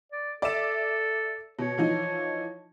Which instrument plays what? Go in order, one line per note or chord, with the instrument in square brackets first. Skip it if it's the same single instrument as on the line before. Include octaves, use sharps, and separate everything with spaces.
[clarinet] D5
[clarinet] A4 [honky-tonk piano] D5 E5 E7
[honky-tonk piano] B2 [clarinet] C#5
[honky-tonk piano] E3 F3 D#4